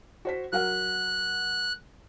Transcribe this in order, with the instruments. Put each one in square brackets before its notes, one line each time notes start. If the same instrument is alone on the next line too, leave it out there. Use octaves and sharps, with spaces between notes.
[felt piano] F#4 C5 B6
[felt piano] F#3 A#4 F#5 [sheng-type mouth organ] F#6